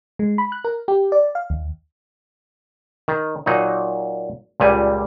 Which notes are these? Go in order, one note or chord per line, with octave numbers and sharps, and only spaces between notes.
G#3
B5
F#6
A#4
G4
D5
F5
D#2
D#3
A#2 F#3 D#4
C#2 A#2 G3 G#5